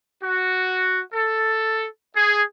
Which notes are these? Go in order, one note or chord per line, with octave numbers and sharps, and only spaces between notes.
F#4
A4
G#4